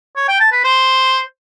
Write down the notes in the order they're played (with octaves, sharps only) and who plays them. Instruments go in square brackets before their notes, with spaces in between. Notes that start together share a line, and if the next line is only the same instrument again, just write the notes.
[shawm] C#5
G5
A5
B4
C5